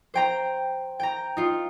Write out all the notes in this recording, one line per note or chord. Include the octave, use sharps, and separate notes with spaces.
C5 G5 A#5
G5 A#5
D#4 F4